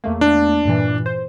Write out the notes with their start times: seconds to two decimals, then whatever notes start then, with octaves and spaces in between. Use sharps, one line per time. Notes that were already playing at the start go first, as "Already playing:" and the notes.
0.04 E2 A3 A#3
0.21 D4
0.65 G2 A#2 E3
1.06 C5